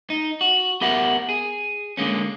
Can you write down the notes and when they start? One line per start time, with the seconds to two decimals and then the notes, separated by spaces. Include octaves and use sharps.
0.10 D#4
0.41 F#4
0.81 B3 G4 A#4 E5 F#5
1.29 G#4
1.97 D3 G#3 A#3 C#4